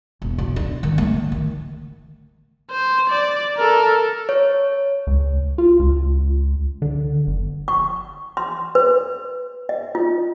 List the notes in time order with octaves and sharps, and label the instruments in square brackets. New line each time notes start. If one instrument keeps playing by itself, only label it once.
[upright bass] E1
B1
D4
D#3
A3
D#3
D#3
[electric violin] C5
D5
A4 A#4
[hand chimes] C#5
[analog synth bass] C#2
F4
C#2
D3
G1
[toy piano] C#6
C6
B4
D#5
F4